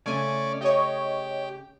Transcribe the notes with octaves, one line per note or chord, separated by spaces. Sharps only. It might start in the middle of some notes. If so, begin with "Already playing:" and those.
C#3 A3 C#4 D5 G#5
G4 C#5 D#5